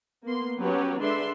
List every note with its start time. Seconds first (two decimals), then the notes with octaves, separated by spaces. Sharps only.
0.25 A#3 B3 C6
0.59 F#3 C#4 G4 B4 C#5
0.99 D3 G#3 D4 B4 E5 C6